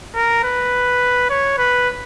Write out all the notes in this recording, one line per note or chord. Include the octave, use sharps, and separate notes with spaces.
A#4
B4
C#5
B4